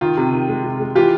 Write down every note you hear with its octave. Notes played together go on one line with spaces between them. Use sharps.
D#3 F4
C3
D#3
G#3
C3
G#3
E3 F4 G4